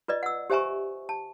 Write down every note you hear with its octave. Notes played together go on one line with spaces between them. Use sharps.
F4 B4 D5 D#5
F#5 E6
G4 C5 E5 G#5 A#5 C#6
A5